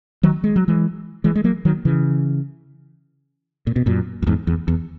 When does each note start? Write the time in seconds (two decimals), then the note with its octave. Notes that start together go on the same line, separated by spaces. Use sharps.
0.23 D#3 F#3
0.44 G#3
0.56 F#3
0.68 E3 G#3
1.24 E3 G#3
1.35 G#3
1.44 F#3 A#3
1.65 D#3 F#3
1.85 C#3 E3
3.67 A#2
3.76 B2
3.86 F#2 A#2
4.22 F#2
4.27 E2 G#2
4.47 E2
4.68 E2